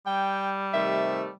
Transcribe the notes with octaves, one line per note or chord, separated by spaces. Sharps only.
G3 G5
C3 D#3 A3 E5